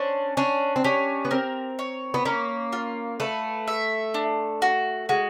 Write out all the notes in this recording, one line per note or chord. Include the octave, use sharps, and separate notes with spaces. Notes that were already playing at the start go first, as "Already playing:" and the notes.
Already playing: C#4 D4 C5
C#4 D4
C4
C#4 G4
B3
C4 A#4
C#5
B3
A#3 C#4
F4
A3 B4
E5
D4
F#4
G#3 F#4